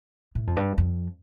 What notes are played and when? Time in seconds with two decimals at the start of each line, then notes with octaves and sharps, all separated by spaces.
0.35 A2
0.47 F2
0.56 G2
0.78 F2